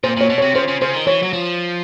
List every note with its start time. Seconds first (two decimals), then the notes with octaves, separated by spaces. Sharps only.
0.04 A#2 C5
0.17 A#2 C#5
0.30 B2
0.38 C#5
0.42 C3
0.55 C#3 C5
0.68 C#3
0.81 C#3 C5
0.94 D#3
1.07 E3 C#5
1.23 F#3
1.33 F3